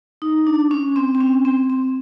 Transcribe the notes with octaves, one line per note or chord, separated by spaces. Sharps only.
D#4
D4
C#4
C4
C4
C#4
C4
C4